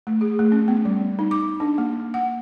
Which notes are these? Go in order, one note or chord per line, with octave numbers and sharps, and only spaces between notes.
A3
G#4
A3
C#4
B3
G3
D#4
D6
D4
A#3
F#5